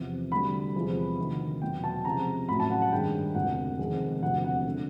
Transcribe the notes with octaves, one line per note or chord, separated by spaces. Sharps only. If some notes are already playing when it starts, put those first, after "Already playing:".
Already playing: E2 C3 F3
D2 D3 G3 B5
E2 C3 F3 G#3
D2 C3 D#3
E2 B2 F#3 G5
A5
C#2 C3 F3 G#3 A#5
A1 A2 F#3 B5
A5
F#5
F#5
G#1 G2 D#3 G#3 G5
E1 D2 C3 F#5
F2 C3 D#3 G#3
E1 D2 C3 F3 F#5
F#5
D3